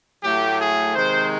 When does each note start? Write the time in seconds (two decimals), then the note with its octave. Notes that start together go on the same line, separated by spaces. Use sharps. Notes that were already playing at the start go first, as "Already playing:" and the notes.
0.23 A2 F#3 A3 G4
0.59 G#4
0.94 C3 D#3 G#3 C5